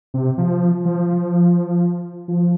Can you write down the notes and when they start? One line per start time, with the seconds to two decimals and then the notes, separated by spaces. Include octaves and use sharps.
0.14 C3
0.38 F3
0.85 F3
2.28 F3